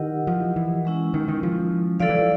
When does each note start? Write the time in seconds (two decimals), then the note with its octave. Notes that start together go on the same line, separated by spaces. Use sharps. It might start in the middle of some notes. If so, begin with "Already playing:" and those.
Already playing: D#3 E4 G4 A#4 D#5 F#5
0.27 F3
0.56 E3
0.85 G#3 C#4 E4
1.14 D#3
1.28 D#3
1.43 F3
2.00 F3 E4 A4 D5 F5
2.09 E3
2.19 F3